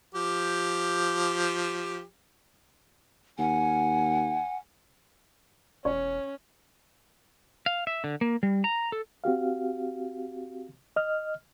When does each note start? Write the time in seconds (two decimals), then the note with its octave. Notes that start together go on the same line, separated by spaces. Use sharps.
0.15 F3 G4
3.39 D#2 F#5 G#5
5.85 E1 C#4 C#5
7.66 F5
7.87 E5
8.04 D3
8.21 A#3
8.43 G3
8.64 A#5
8.92 A4
9.24 C4 F#4 G4 F5
10.96 D#5 F6